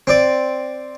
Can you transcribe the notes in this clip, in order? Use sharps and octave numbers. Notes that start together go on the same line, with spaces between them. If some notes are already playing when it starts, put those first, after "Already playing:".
C4 D5